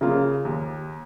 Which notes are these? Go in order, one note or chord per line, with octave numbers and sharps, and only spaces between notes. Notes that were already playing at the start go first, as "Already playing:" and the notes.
C#3 A#3 F4
D#2